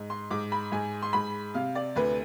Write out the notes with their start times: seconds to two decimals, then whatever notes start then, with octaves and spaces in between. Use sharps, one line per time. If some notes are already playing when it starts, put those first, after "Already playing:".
Already playing: G#2
0.10 C6
0.31 G#2 D6
0.52 B5
0.72 G#2 G#5
1.02 C6
1.13 G#2 B5
1.54 C3 F5
1.75 D5
1.96 D2 B4